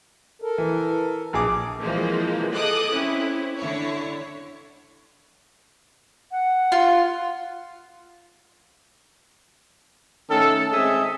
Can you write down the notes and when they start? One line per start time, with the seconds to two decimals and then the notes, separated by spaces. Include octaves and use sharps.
0.42 A4 A#4
0.58 E3
1.33 A#1 B2 G#4 D6
1.81 C3 E3 F3 G#3 A#3
2.52 G#4 A4 D#5 D6 D#6 F#6
2.92 C4 C#4 E4
3.59 D3 E4 C#5
6.32 F#5
6.72 F4
10.30 D#3 A3 C#4 A4
10.72 G#3 C4 A4 D#5 E5 G#5